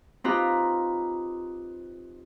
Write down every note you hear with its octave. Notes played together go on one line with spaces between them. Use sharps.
C4 D#4 F4 G4 B4 A#5